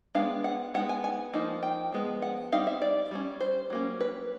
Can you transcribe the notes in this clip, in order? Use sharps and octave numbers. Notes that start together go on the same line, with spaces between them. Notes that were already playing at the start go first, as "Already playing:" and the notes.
G#3 B3 D4 F5
F#5
G#3 B3 D#4 F#5
G#5
G#5
F3 A#3 D#4
G5
F3 G#3 B3
F#5
G3 C4 D#4 F5
E5
D5
G3 A#3 C#4
C5
F#3 A#3 C#4
B4